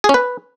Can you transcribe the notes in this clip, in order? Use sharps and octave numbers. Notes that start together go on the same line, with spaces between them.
G#4
C#4
B4